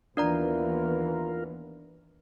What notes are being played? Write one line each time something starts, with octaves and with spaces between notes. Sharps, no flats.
D#2 E3 B3 D4 F4 A#4 D5 A#5